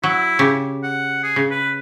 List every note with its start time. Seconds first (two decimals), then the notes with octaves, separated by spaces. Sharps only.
0.03 F#3 E4
0.39 C#3 G4
0.83 F#5
1.23 G#4
1.36 C#3
1.51 B4